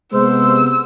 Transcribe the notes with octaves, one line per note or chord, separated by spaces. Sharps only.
C3 G#3 A#3 B3 C5 E6